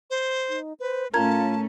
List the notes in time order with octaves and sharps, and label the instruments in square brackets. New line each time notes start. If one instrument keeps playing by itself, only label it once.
[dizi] C5
[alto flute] D#4
[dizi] B4 [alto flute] C5
[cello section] A2 A3 C#4 [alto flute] F4 [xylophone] A#4 A#5 G#6 [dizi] A5